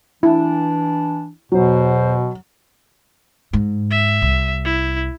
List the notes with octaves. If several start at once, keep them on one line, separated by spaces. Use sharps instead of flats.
E3 D4 E4
E2 B2 F#3 C5
G#2
E5
C2
E4